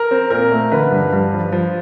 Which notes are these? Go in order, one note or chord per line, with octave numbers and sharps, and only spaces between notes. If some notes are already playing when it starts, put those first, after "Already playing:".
Already playing: A#4
C4
A#2 A#4
A3
D3 B4
G2
G2
F3
F3